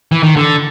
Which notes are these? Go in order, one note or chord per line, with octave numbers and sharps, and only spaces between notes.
E3
D#3
D3